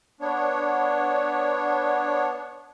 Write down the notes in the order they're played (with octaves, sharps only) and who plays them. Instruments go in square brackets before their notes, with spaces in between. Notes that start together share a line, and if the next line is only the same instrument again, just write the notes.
[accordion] B3 D4 C#5